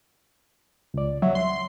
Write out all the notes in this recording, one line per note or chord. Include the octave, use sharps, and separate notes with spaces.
C#2 D5
F#3 E5
C6